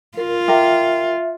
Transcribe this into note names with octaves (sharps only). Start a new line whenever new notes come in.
F4 A#4
G4 A#4 E5